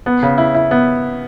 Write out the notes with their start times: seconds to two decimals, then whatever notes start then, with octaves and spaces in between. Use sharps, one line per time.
0.06 B3
0.23 C#3
0.38 E4
0.54 E4
0.71 B3